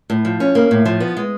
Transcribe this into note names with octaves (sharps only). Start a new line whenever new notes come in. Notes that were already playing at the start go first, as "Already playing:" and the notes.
A2
F3
C#4
A#3
A2
F3
B3
G#3